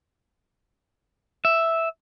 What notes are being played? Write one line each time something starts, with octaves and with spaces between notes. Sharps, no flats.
E5